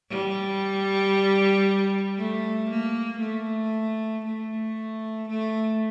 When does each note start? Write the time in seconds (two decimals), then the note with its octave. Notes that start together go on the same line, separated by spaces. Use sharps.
0.10 G3
2.18 A3
2.70 A#3
3.21 A3
4.25 A3
5.30 A3